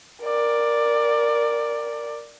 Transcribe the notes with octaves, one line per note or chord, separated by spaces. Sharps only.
A#4 D5